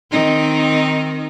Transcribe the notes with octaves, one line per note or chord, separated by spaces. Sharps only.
D#3 C4 D#4